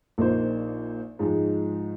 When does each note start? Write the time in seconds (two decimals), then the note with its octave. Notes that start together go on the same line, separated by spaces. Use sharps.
0.18 A#1 A#2 A#3 D#4 C5
1.19 G#2 F3 G#3 D#4